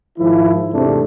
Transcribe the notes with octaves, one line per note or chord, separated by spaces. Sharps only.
G#2 D#3 F3 E4
E2 G#2 C3 A3 C4 D4